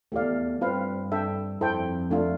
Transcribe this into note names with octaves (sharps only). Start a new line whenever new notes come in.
E2 A3 E4 G4 D5 F5
G2 C4 F4 B4 F5
D4 A4 E5 G5
F2 E4 A4 C5 G5
A3 D4 F4